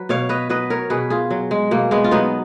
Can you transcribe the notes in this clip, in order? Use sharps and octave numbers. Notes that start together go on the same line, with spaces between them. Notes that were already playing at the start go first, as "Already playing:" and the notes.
Already playing: F#3 B4
B2 C#5 F5
B4 D#5
F#3 B4 D#5
A#4 C#5
B2 G#4 B4
F4 G#4
F#3
G#3
B2 A#3
G#3 B3
F4
F#3 B3 D#4